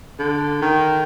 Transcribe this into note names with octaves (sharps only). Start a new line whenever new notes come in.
D3
D#3